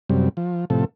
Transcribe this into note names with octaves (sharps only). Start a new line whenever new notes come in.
F#2 C3 G3
F3
A2 C3 F3 A4